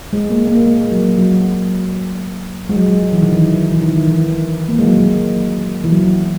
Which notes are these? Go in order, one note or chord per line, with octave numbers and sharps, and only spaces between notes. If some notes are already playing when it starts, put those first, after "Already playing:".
G#3
A#3
A#3
G#3
F#3
F#3
G#3
F#3
F#3
E3
D#3
E3
E3
D#3
E3
A#3
G#3
F#3
E3
F#3